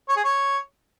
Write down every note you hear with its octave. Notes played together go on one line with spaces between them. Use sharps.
C#5
G#4
C#5